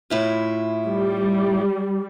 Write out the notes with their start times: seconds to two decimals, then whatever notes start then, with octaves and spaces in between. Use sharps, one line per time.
0.10 A2 E4 F4
0.90 G3